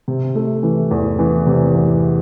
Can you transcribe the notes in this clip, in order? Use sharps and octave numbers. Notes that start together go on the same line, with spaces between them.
C3
A3
E3
E2
E3
C3
E2